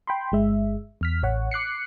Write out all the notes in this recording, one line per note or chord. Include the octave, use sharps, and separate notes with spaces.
G5 B5 C6
G1 G#3 E5
E2 F6 B6
A1 C#5 F#5
D6 F#6 C7 C#7